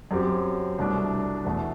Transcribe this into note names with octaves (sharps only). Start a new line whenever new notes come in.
F#2 F#3 C4 G4
C2 B2 A3 D4
E2 B2 A3